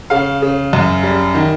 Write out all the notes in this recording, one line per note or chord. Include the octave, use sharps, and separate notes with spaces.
C#3 F5
C#3
F#2
G3
D#3